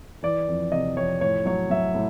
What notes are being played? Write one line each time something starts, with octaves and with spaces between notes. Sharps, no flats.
E3 D5
F2
C3 D#5
F2 C#5
A2 C#5
F#3 C#5
F#3 E5
A2